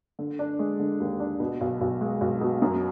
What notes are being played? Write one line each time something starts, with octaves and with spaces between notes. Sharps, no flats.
D3
D4
G#3
D3
D#2
D4
B2
B1
B1
G#3
B1
B2
F#2